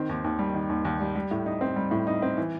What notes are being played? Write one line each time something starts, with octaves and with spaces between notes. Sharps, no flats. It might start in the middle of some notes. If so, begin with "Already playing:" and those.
Already playing: D#3 C4
D#2
D#2
G3
D#3
D#2
D#2
G3
G3
A2
D#4
C4
G3
A2
D#4
C4
E3